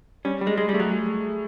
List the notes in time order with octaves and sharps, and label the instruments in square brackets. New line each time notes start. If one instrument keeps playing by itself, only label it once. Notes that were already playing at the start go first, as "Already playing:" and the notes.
[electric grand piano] G3 [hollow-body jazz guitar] C#4
[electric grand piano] G3
[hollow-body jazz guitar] G#3
[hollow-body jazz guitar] G#3 [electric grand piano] G#4
[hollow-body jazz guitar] G3
[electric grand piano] A3
[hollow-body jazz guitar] F#3